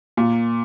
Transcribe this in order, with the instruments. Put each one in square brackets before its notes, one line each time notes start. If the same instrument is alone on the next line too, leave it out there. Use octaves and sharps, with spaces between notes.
[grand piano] A#2